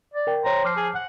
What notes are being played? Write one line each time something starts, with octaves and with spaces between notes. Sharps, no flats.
D5
A#4 G5
C5 C#5 G5 A#5
F3 D6 F6 C7
G#4
F#5